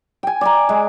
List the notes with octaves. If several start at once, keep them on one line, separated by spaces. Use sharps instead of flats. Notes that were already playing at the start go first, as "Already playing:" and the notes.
G5 G#5
D5 G#5 A#5
G#3